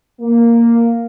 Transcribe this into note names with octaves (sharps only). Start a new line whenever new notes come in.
A#3